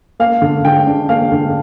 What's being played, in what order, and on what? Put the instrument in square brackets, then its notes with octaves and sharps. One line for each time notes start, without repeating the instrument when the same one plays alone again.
[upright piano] A#3 F5
D3
D3 G5
D4
A#3 F5
D3